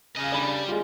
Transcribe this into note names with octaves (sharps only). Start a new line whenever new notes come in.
C#3 F4 D#5
G3 D4 B5 D#7
G#3 F4